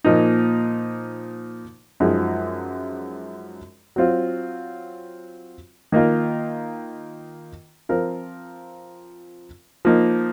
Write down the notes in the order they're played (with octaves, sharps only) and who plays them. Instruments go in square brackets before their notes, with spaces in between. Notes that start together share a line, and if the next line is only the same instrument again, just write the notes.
[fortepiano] A#2 F3 A#3 D#4
F#2 F3 G#3 D#4 G#4
F#3 C4 F4
D#3 A#3 F4 A#4
F3 C4 F4 A#4
F3 A#3 D#4